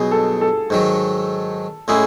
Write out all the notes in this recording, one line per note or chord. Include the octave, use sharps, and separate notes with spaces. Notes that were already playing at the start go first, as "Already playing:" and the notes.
Already playing: B2 F#3 B3 D#4 G#4
A4
A4
G#2 D#3 F#3
A2 G#3 C#4 E4 G#4